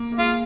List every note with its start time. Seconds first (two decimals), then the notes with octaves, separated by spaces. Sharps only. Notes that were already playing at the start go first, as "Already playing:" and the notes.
Already playing: A#3
0.12 A#3
0.18 G#3 F4